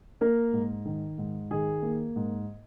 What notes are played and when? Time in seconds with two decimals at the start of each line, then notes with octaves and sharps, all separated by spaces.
0.21 A#3 A#4
0.53 G#2
0.85 D#3
1.18 G#2
1.51 D#3 G#4
1.82 A#3
2.16 G#2